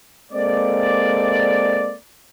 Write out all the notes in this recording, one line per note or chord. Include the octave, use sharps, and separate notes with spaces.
G#3 A#3 C4 A4 D5